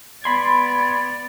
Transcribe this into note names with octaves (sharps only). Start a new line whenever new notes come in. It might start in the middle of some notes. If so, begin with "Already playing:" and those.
B3 D5 B5 C6 G#6